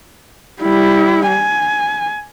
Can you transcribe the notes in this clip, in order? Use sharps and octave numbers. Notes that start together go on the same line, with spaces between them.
G3 E4
G#5